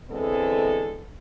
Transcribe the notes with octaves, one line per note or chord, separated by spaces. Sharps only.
D3 E3 G#3 B3 C4 A4